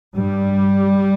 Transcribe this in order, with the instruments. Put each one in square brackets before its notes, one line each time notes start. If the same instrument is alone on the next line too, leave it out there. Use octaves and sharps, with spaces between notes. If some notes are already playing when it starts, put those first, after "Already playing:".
[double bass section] G2 G3